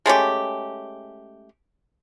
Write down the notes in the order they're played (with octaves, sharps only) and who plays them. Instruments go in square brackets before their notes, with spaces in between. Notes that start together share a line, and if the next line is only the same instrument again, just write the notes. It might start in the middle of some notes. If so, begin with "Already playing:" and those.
[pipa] G#3 A3 C#4 G4